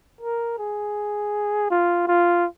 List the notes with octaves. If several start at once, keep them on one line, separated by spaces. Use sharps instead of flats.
A#4
G#4
F4
F4